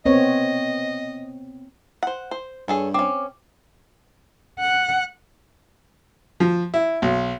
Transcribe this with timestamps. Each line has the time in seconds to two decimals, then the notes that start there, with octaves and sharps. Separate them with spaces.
0.06 B3 C4 C#5 D#5
2.03 C5 F#5
2.31 C5
2.68 G2 G#4 A4 C#5
2.94 C4 C#4 D6
4.60 F#5
6.40 F3
6.74 E4
7.02 B1